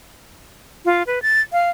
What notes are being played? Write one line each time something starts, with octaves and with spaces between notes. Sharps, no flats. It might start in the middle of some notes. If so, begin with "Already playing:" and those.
F4
B4
A6
F5